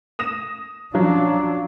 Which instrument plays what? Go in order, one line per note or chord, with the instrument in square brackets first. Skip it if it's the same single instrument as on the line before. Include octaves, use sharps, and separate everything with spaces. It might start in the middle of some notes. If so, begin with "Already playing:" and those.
[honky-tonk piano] D#6 A#6 E7
[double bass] F3 D4 [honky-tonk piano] F#3 C#4 F4